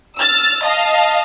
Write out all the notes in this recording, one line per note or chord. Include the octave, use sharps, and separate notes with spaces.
E6 F6 A6
D#5 F5 A5